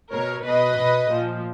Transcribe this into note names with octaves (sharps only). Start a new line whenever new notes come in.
B2 A#4 C#5
B2 B4 D#5
B2
A#2 F3